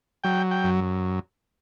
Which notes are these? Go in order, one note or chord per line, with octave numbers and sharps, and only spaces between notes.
F#3 G5
G5
F#2